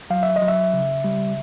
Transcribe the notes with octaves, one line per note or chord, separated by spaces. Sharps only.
F#3 F5
E5
D#5
F#3
E5
C#3
G3